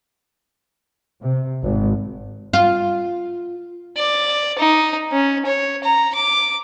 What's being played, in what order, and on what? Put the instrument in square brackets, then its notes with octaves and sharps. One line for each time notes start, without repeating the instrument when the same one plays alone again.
[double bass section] C3
G#1
[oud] F4
[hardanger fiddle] D5
D#4
C#4
C#5
A#5
D6